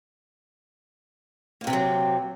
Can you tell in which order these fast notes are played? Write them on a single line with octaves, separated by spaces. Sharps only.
A#3 D#3 C3 C4 F#3